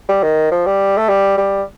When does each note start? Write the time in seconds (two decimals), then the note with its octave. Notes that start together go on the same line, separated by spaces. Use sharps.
0.09 G3
0.23 D#3
0.51 F3
0.66 G3
0.97 A3
1.09 G3
1.38 G3